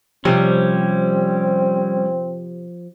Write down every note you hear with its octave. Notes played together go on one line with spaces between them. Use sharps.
C3 F3 G3 C4 C#4